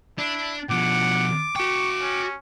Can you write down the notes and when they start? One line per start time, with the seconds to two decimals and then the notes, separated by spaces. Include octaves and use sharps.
0.18 D4 E4
0.70 B2 F3 F#5 D6
1.56 F#4 G5 C#6
2.01 C#4